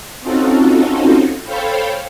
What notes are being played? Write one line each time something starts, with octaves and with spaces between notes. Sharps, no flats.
C4 C#4 D#4 F4 F#4 A4
A4 C5 C#5 F5 G5 B5